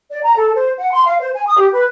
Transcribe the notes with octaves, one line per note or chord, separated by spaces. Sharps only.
D5
A#5
A4
C5
F#5
C6
F5
C5
G#5
D#6
G4
B4